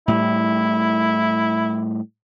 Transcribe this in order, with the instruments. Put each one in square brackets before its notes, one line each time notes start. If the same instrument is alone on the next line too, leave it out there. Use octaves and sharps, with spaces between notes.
[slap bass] A2 G3 [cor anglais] E4